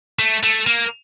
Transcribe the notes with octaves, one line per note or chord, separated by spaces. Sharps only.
A3
A3
A#3